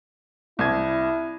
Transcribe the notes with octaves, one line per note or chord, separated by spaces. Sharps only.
C2 E4 G#6